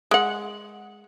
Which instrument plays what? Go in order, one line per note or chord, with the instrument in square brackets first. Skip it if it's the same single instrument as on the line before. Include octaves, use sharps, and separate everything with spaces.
[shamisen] G#3 F#5